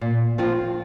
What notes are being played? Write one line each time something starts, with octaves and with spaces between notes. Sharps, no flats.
A#2
F3 C4 F4